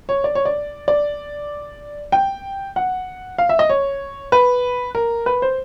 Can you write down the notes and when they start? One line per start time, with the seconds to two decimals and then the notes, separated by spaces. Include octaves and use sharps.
0.09 C#5
0.24 D5
0.35 C#5
0.45 D5
0.88 D5
2.12 G5
2.76 F#5
3.38 F5
3.49 E5
3.59 D#5
3.69 C#5
4.32 B4
4.95 A#4
5.26 B4
5.42 C5